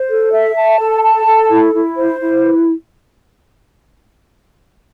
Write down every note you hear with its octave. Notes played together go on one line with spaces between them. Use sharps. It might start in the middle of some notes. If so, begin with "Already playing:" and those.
Already playing: C5
A4
E5
A5
A4
A5
A4
E4
E4
C5
E4
B4